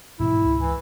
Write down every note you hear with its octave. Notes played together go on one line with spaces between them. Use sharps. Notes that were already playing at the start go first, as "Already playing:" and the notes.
G#2 B2 E3 E4
C#2
E3